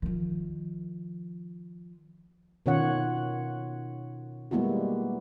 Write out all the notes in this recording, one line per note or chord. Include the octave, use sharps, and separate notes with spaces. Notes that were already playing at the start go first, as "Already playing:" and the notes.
D#3 F3
B2 D#3 C#4 F4 C#5 F#5
G3 G#3 A#3 B3 E4 F#4